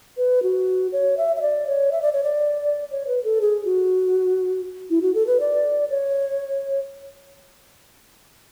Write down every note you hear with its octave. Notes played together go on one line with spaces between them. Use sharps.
B4
F#4
C#5
E5
E5
D5
C#5
E5
D5
C#5
D5
C#5
B4
A4
G#4
F#4
E4
F#4
A4
B4
D5
C#5